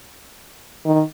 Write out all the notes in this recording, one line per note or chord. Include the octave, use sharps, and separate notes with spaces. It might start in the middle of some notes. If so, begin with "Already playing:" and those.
D#3